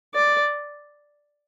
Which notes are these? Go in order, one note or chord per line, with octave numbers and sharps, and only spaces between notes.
D5